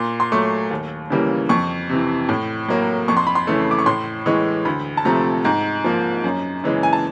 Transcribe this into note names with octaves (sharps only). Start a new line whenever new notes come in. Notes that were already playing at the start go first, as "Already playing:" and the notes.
Already playing: A#2 C6
C6
F#3 A3 C#6
D#2
C#3 E3 G3 A#3
F2 C#6
C3 E3
A2
F#3 A#3
F2 C#6
C6
B5
C6
C#3 E3 A3
D6
C#6
A2 C6
E3 G#3 C#6
D2 B5
A5
C3 F3 A3 A#5
G#2 A#5
F3 A#3
F#2
C#3 E3 G#3
G#5
A5